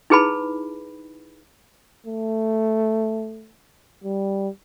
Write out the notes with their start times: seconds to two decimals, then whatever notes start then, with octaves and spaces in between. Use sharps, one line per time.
0.10 D#4 E4 G#4 B4 A5 B5
2.06 A3
4.04 G3